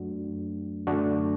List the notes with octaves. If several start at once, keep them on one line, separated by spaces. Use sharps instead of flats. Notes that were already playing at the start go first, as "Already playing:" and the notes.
Already playing: F#2 F#3 A3 D4 F#4
F#2 D3 F#3 A3 D4 F#4